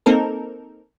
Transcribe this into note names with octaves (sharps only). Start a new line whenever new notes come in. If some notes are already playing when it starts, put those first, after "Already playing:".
A#3 C4 D#4 A4 A#4